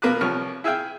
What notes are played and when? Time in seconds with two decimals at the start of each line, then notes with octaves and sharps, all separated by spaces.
0.02 B2 A#3 B4 D6 F#6
0.21 C2 F3 C#5 F6
0.64 E4 G#4 E5 F5 G5